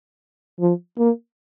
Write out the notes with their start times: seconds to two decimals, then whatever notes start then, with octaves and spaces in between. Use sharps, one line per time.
0.60 F3
0.99 A#3